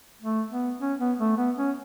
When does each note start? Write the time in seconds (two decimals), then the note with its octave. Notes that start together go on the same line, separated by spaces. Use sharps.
0.22 A3
0.51 B3
0.81 C#4
0.99 B3
1.19 A3
1.37 B3
1.57 C#4